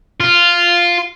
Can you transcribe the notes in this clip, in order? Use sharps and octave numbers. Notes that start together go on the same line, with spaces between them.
F4